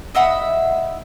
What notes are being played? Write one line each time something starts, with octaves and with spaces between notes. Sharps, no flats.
D#5 E5 F#5 B5